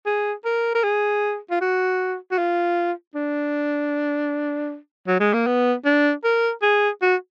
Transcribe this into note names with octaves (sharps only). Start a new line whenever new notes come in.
G#4
A#4
A#4
G#4
F4
F#4
F#4
F4
D4
F#3
G#3
A#3
B3
D4
A#4
G#4
F#4